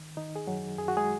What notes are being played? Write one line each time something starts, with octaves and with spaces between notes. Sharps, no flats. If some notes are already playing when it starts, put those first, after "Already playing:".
Already playing: D#3
D#3 D#4
G#4
F#2 F#3 F#4
F#2 G#4
F#4
G#3 G#4